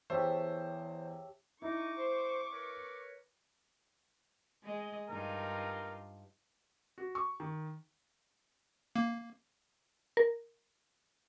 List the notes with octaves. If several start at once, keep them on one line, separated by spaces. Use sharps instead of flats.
E2 E3 G4 C5 C#5 E5 A5
D#4 E4 C#6 D6
C5
A#4 B4 C#5
G#3 D#5
G2 D#4 F4 A#4
F#4
C#6
D#3
A#3
A#4